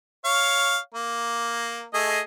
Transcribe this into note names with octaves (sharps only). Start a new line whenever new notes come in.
C#5 F5
A#3
A3 G#4 D#5